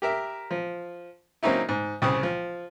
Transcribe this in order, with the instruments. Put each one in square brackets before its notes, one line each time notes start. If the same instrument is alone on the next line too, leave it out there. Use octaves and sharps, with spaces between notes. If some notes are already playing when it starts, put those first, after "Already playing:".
[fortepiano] G4 A#4 E5
F3
F#3 A#3 C4 C#4 D#4 E4
G#2
C2 C#3 C4 D#6
F3